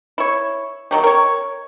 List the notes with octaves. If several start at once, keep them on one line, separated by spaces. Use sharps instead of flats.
E4 C#5
D#3 F#3 G4
A#4 C#5